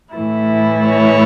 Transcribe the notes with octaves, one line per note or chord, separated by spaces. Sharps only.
A2 E3 A3 E4
C#5